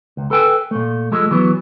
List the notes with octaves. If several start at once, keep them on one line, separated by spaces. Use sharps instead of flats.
C#2
A4 B4 G5 G#5
A#2 A3
F3 G#3 A3
E3 F#3 B3